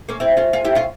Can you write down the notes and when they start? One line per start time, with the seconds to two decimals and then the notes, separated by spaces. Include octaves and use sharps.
0.09 A#3 C#4
0.20 C4 E4
0.37 C#4 F4
0.53 F4 G#4
0.65 E4 G4
0.75 C#4 F4